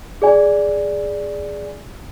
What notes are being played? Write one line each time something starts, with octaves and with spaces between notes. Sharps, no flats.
G#4 D5 G#5